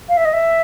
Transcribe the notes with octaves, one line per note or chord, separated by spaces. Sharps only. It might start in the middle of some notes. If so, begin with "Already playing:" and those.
F5
E5
D#5
E5